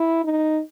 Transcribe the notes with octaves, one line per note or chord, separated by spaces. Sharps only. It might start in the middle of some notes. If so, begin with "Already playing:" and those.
Already playing: E4
D#4